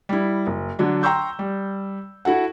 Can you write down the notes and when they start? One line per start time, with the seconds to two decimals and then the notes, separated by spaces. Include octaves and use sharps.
0.09 G3 E4
0.47 F#1
0.79 D3 F#3 D4
1.03 G5 A#5 C6 C#6 E6 G6
1.39 G3
2.25 E4 F#4 A4 F#5